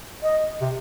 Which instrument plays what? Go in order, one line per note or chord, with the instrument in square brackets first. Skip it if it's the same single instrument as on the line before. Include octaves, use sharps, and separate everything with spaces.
[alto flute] D#5
[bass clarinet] C3